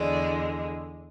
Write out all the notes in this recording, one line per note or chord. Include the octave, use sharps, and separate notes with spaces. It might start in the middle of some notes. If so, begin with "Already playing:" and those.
Already playing: E2 D3 G#3 D5